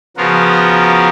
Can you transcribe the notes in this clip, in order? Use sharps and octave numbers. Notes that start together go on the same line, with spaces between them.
C#3 F3 B3 F4 F#4 A#4